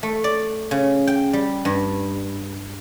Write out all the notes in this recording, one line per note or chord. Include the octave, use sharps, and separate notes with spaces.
A3
D5
C#3
G5
G3
G2